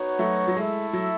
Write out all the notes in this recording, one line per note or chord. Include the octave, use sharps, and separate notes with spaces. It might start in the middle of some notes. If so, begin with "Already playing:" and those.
Already playing: B3 D#4 F#4 C#5
F#3 A3
F#3
G#3 A3 E4 A4 E5
F#3